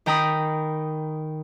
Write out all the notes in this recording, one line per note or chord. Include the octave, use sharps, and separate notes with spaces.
D#3 G5 A#5 B5 D#6